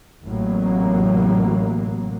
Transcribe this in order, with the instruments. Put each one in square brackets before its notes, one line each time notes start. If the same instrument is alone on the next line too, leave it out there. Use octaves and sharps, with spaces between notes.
[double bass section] A1 A2 C3 F#3 A#3